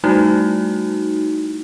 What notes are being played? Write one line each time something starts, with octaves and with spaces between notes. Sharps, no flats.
G3 A3 D#4 E4 F#4